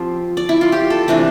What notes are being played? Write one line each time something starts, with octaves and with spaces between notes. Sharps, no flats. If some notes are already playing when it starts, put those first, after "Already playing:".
Already playing: F3 C4 F4 G4
D5
E4
F4
G4
A4
C3 E3 A3 D4 B4